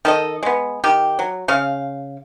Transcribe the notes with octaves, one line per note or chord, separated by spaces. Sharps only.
D#3 A4 D#5
G#3 B3
D#3 G4
F#3
C#3 F5